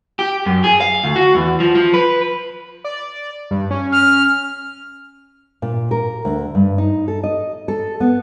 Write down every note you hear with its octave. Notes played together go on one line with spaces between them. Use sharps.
G4
F#2
G#4
F5
D2
F#4
E2
F3
F3
B4
D5
G2
C#4
F6
A#2
A#4
D2
G2
D#4
A4
D#5
A4
B3